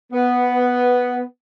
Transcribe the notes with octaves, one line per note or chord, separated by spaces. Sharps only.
B3